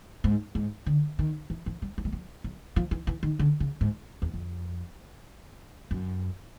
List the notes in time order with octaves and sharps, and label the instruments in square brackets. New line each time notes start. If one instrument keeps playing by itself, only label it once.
[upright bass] G#2
G#2
D3
D#3
E3
F3
G3
F#3
G3
F#3
F#3
F3
E3
E3
D#3
D3
C#3
G#2
E2
F2
F#2